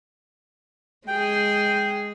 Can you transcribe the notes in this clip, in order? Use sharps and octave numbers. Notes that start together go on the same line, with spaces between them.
G#3 G#4 G5